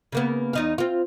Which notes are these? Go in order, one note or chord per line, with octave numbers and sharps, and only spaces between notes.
C#3 A#3 B3
E2 D#4 F5
C4 F4